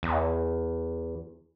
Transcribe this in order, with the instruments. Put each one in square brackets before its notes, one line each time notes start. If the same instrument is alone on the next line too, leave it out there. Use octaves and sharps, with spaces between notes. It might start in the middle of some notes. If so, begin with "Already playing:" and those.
[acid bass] E2